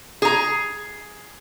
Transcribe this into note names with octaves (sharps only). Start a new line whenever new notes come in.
G#4 A#5